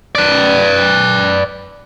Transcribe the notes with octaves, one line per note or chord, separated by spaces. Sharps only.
B4 D5